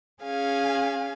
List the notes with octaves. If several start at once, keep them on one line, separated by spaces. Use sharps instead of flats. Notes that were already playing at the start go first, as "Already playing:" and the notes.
C#4 G#4 F5 G#5